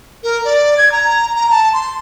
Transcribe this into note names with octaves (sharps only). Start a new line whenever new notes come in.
A#4
D5
G#6
A#5
A#5
A5
C6